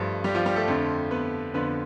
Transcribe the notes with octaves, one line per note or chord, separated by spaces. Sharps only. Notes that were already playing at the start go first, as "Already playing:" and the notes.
Already playing: G2 F3 A3
G3 G4
F3 F4
G3 G4
A3 A4
F2 D3 F3
B3 B4
F2 D3 F3 B3 B4